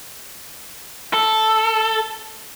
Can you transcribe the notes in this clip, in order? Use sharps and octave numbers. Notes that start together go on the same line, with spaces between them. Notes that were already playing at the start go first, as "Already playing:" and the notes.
A4